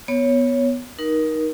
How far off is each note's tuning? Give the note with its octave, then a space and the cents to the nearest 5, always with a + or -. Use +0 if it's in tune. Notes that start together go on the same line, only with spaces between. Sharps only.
B3 +0 C#5 +0
D#4 +0 A#4 +25